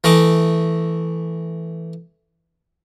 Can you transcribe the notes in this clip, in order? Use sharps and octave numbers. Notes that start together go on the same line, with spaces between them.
E3 A3 D#5 D6